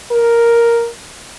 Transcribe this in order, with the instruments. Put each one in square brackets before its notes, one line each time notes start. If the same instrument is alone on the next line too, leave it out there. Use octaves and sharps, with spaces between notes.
[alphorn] A#4